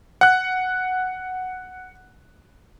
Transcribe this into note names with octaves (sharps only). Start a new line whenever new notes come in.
F#5 F#6